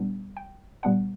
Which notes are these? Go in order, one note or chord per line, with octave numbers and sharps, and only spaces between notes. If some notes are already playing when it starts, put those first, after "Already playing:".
Already playing: A#2 G3 B3 D4
G5
A#2 G3 B3 D4 F#5